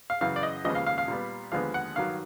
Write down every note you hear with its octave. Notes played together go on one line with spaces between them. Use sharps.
F5
F#2 C#3 E3 F5
D5
D#5
D#2 C#3 F3 G#3 B3 D#5
F5
F5
F5
A#2 G3 B3
D#2 D3 F3 G#3 B3 F5
F#5
G2 D#3 F#3 F5